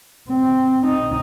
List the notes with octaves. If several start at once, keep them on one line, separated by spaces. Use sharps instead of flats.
C4
D#4